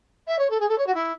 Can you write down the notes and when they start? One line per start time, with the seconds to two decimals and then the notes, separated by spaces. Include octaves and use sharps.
0.27 E5
0.38 C#5
0.50 A4
0.60 G#4
0.68 A4
0.78 C#5
0.86 F#4
0.94 E4